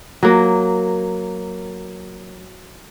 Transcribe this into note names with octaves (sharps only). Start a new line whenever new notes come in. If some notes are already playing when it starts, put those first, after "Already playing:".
F#3 A#3